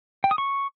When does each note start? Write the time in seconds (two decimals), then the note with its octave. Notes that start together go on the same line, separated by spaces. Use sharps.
0.24 G5
0.31 D#6
0.38 C#6